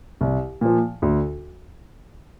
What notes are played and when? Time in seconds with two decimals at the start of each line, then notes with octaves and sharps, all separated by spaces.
0.21 C2
0.61 A#2 F3
1.02 D2